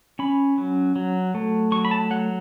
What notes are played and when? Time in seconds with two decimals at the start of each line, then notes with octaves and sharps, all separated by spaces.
0.19 C#4 B5
0.58 F#3
0.96 F#3
1.34 A3
1.71 F#3 C#6
1.85 B5
1.91 A5
2.10 F#3 F#5